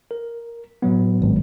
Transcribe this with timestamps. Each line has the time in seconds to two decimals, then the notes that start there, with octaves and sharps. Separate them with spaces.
0.11 A#4
0.82 A2 F#3 B3
1.22 G#1